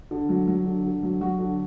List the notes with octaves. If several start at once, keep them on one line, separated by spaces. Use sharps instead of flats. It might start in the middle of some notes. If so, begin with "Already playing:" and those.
D3
F#3
F#3
D3
D3
F#3
F#3 F#4
D3